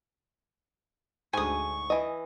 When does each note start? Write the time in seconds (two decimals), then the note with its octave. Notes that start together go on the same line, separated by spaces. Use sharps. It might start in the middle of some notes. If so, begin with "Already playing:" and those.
1.33 D2 G#2 G#5 C#6 D#6
1.90 E3 D#5